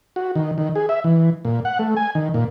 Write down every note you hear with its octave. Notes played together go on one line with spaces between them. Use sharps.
F#4
D#3
D#3
G#4
E5
E3
A#2
F#5
A3
G#5
D#3
A#2